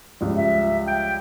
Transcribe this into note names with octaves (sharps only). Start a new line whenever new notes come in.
C#2 F3 G3
E5
G5